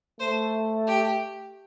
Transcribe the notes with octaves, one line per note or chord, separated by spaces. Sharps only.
A3 C5
G4